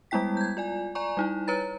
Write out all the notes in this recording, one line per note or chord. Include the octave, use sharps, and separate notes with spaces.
G3 G#3 B3 E4 G5 B6
G6 G#6
F4 D5 G#5
D5 G#5 A#5 C#6
G3 D#4 E4
B4 C#5 A#5 A6